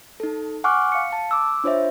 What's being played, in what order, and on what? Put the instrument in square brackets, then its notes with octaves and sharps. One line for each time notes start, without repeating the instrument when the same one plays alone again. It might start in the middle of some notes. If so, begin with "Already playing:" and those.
[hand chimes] D#4 A4
F#5 G#5 C#6 D6 F6 F#6
F5 C#7
A5
D6 E6
D4 F4 C5 C#5 D#5 E5